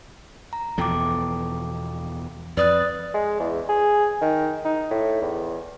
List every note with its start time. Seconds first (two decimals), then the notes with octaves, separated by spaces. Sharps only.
0.53 A#5
0.78 E2 B2 F3 A4 G5 D6
2.57 F2 B4 D5 D#6 F#6
3.14 G#3
3.40 E2
3.69 G#4
4.22 D#3
4.65 D#4
4.91 A2
5.22 E2